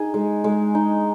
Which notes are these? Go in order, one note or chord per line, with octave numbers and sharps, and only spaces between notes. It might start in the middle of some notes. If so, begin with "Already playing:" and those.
Already playing: D#4 G#4
G#3
G#3
D#4